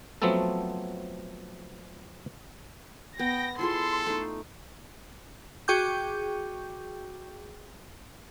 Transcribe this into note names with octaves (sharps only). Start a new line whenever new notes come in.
F3 F#3 A3 B3 C4 A4
B3 G5 A#6
E4 F4 G#4 A4 C6
A3 D#4
F#4 G#4 G5 C#6 D6 G6